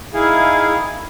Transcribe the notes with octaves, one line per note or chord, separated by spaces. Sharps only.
D#3 E4 G#4 F5